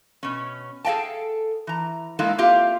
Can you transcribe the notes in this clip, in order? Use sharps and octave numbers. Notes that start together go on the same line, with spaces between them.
B2 C#4
G#4 A4 D#5 F5 G5 A5
E3 A#5
G#3 A#3 E4 A4 D#5 F5
A#3 C4 F4 G4 E5 F5